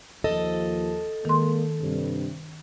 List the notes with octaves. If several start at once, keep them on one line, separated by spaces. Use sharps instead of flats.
D#2 F3 A4 D#5
D#3 G#3 A#3 C6
G2 C3